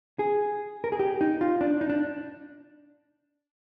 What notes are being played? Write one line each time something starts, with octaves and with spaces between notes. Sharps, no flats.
G#4
A#4
G#4
G4
D#4
F4
D4
D#4
D4